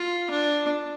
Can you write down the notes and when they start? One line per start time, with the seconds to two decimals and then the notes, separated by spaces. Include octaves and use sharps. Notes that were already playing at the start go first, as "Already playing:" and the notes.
Already playing: F4
0.30 D4